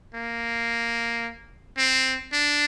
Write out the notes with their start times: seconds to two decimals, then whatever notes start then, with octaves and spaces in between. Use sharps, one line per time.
0.14 A#3
1.78 C4
2.32 D4